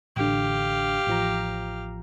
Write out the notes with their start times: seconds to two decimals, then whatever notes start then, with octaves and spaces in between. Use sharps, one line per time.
0.16 A1 D3 G4 F5
1.07 A1 F3 A#5